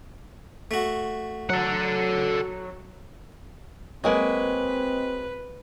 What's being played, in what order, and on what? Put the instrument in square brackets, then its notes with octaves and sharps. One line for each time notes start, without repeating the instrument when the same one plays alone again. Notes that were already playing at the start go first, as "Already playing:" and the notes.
[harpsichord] A3 F#4
[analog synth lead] F#3 [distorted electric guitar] A4 F#5
[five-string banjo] F#3 G#3 A#3 [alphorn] C4 [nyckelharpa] B4 [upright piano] D#5